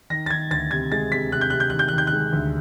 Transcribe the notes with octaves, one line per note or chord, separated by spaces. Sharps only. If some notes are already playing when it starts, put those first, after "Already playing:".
D#3 A#6
A6
D#3 G#6
D2 A6
C3 G#6
G#3 A6
C3 B6
C3 F#6
G6
C3 F#6
G6
D#3 F#6
G6
D#3 F#6
G6
F#6
G#3
D2